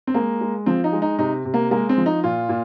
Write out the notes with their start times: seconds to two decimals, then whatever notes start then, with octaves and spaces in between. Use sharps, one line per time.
0.07 C4
0.14 G#3 A#3
0.41 G#3
0.66 F3 C4
0.84 D#4
0.92 G#3
1.02 D#4
1.19 C3 D#4
1.45 C3
1.54 A#3
1.71 G#3 A#3
1.89 C4
1.98 F3
2.06 D#4
2.23 A#2 F4
2.49 A#2